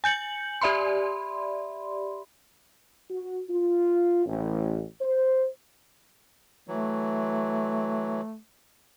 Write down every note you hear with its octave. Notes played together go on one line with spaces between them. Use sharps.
G#5 G6 C#7 F#7
G4 D5 E5 B5 C6
F#4
F4
A1
C5
E3 F#3 A3